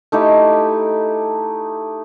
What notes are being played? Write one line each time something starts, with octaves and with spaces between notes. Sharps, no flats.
A3 D#4 E4 G4